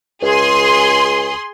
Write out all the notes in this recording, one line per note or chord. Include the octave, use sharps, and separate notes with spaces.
C#2 G#4 C6